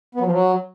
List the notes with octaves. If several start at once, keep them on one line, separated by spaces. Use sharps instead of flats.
B3
F#3
F3
F#3